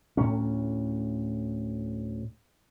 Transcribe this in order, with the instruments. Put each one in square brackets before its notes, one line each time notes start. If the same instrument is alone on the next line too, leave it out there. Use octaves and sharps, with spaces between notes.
[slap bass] D2 A2 A#3 C#4